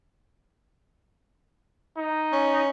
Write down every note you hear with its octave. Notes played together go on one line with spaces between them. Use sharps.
D#4
C#4